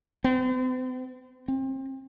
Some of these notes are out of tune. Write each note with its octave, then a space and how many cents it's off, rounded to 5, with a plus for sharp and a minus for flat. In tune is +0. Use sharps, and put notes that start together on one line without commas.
C4 -45
C4 +30